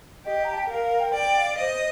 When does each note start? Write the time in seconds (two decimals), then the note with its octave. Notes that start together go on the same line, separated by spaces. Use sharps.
0.25 G4 D#5
0.44 A#5
0.53 A5
0.61 G5
0.70 A#4 F5
0.84 F5
1.00 G5
1.14 D5 G5
1.36 F5
1.59 C5 D#5